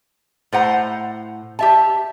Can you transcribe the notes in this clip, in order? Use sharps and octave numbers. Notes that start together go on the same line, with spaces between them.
A2 C5 F#5 A#5
G4 E5 A5